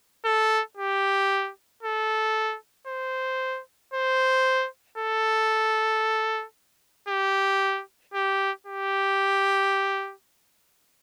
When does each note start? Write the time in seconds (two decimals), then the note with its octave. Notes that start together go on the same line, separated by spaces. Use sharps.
0.25 A4
0.77 G4
1.83 A4
2.88 C5
3.94 C5
4.98 A4
7.09 G4
8.14 G4
8.67 G4